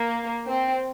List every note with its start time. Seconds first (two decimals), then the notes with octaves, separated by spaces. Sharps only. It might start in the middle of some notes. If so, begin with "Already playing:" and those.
Already playing: A#3
0.48 C4